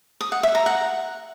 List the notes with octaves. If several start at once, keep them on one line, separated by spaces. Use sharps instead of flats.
D#6
F#5
E5
A#5
F#5